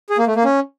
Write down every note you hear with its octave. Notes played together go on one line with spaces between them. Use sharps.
G#4
A#3
A3
A#3
C#4